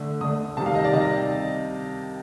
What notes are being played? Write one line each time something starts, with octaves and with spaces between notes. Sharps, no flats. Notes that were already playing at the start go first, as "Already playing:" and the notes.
Already playing: D3 A3 D4
D3 A3 D4 D#6
C3 D#3 G3 A5
F5
D#5
D5
C3 D#3 G3 D#5